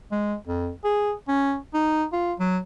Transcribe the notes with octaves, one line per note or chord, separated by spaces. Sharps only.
G#3
F2
G#4
C#4
D#4
F4
F#3